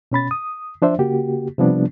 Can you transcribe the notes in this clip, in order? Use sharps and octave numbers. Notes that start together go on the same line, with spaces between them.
B2 C#4 B5 A6
D#6
F3 D4 C5 E5
C#3 A#3 F#4 G4
C3 F3 G3 B3 D4